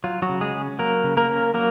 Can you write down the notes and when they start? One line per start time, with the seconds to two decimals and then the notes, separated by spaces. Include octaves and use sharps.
0.04 F#3 F4
0.22 F#3 F#4
0.29 C#3
0.41 G#3 G#4
0.54 C#4
0.79 F#3 A#3 A#4
1.04 C#3
1.17 A#3 A#4
1.29 C#4
1.54 F#3 A#3 A#4